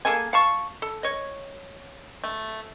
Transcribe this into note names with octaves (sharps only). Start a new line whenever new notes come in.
A#3 G#4 A4 G#5
F5 A5 C#6
A4
C#5 D#5
A3